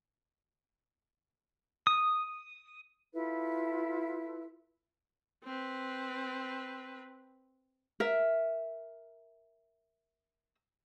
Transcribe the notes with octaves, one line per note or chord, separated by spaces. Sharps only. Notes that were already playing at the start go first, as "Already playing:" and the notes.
D#6
E4 F4 A4 B4
C4 B4
A#4 E5